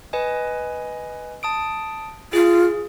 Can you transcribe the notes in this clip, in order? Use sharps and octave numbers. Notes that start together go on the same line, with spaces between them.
B4 D#5 G#5
A5 D#6 D7
F4 G#4